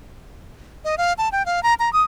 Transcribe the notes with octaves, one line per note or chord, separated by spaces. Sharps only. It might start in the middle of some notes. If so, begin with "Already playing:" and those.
D#5
F5
A5
G5
F5
A#5
A#5
D#6